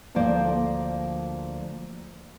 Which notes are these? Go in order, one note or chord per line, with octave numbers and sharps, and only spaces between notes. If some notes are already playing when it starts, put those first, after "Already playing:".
D2 F3 A#3 C5 D5